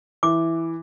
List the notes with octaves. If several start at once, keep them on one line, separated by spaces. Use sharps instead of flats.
E3 D6